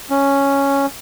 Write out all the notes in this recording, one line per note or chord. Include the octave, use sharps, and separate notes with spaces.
C#4